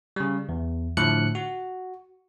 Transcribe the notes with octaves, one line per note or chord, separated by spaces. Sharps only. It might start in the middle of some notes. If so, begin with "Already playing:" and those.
C#3 G3
E2
A2 D3 F3 F#6 C#7
F#4